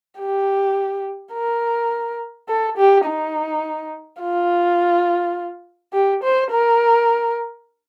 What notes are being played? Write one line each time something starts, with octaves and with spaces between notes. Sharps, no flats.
G4
A#4
A4
G4
D#4
F4
G4
C5
A#4